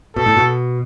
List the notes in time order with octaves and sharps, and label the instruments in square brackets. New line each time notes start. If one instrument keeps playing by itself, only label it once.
[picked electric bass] B2 [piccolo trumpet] A4
[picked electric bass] A2
B2